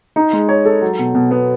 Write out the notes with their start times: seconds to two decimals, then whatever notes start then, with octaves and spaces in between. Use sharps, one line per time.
0.16 D#4
0.33 G#3
0.49 C#5
0.65 A4
0.82 F#3
0.99 B2
1.15 B2
1.31 B3